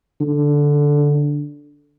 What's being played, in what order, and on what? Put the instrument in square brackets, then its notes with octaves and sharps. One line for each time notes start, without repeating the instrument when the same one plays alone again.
[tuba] D3